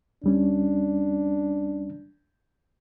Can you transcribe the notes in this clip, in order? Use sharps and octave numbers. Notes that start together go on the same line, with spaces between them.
D2 G3 C#4 D4